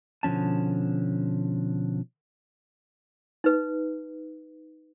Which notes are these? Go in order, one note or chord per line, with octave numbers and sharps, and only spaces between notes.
B2 D3 F3 C#4 A5
D#4 B4